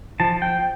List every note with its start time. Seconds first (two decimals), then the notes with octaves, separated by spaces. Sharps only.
0.20 F3 A5
0.42 G5